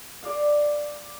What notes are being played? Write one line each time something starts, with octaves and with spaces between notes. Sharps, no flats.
D5 F5